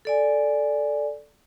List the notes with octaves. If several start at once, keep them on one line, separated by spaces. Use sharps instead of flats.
A4 D5 G#5